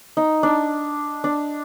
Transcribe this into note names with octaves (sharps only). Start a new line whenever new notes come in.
D#4
D4
D4